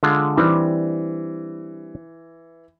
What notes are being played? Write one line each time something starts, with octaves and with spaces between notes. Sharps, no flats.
D3 G#3 F4
E3 G3 C4 D4